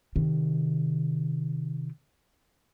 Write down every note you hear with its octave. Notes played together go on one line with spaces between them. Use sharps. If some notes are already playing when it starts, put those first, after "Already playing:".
C3 D#3